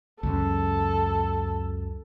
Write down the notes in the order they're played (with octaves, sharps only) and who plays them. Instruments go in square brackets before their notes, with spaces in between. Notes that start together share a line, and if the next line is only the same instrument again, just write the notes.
[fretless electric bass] C#2 F#2 C#3 [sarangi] A4